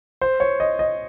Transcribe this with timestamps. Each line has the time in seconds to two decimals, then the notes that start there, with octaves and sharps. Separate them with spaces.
0.21 C5
0.40 C#5
0.60 D#5
0.79 D#5